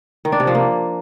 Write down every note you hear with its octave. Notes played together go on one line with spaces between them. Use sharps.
D#3
D4
C3
F3
A#3